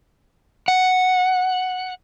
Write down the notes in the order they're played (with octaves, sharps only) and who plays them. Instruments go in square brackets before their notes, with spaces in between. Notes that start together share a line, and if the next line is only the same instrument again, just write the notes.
[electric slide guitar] F#5